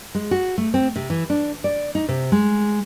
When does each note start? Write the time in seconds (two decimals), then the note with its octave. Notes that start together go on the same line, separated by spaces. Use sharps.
0.15 G#3
0.31 F#4
0.58 A3
0.74 C4
0.96 C3
1.10 E3
1.30 D4
1.64 D5
1.95 D#4
2.09 C3
2.32 G#3